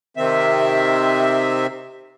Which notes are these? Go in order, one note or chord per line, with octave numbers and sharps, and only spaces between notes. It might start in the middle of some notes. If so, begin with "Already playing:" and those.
C3 D#3 C4 E5